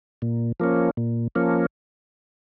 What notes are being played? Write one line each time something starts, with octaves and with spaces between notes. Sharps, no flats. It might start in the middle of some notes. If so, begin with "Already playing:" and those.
A#2
F3 A#3 C#4
A#2
F3 A#3 C#4